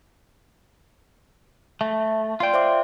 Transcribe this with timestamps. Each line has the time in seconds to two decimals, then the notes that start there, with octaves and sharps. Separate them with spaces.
1.81 A3 E5
2.40 F4 D5 G5 C6
2.54 C5 E5 D6